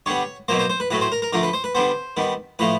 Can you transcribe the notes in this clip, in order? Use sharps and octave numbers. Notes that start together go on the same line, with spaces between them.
D3 G3 B3 C#5
B2 F#3 A#3 C5
C5
C5
B4
A2 F#3 A3 B4
C5
A#4
A#4
D3 F3 A3 A#4
B4
C5
B4
D3 G3 B3 C5
D#3 G3 B3
A2 F3 A3 B4